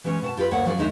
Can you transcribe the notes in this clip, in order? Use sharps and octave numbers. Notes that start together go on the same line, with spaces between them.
E3 G3 G#3 C#4
B2 F#5 A5
F4 G4 A4 B4
D2 G2 A#3 C#5 F#5
F3 F#3 C#4 G#4 A#4 D5
D#2 D#3 G#3 D4 D#4 E5